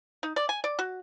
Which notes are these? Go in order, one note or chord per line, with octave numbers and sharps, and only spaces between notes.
D#4
D5
G#5
D5
F#4